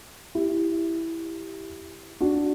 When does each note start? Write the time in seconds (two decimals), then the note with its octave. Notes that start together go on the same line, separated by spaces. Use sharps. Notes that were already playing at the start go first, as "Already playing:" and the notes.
0.35 E4 G4
2.21 D4 F#4